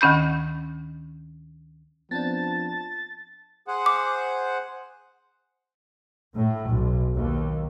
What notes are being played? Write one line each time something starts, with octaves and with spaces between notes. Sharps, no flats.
D2 D#3 C#4 B5 G6
F3 B3 C4 D4 A5 A6
G#4 C5 F#5
D6
A2
B1
D#2